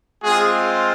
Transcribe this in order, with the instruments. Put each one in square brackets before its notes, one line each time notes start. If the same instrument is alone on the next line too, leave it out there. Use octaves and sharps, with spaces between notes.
[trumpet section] G#3 C4 F4 G#4